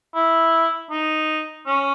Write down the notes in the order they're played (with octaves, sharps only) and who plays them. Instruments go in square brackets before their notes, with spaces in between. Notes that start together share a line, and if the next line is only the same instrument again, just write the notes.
[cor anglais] E4
D#4
C#4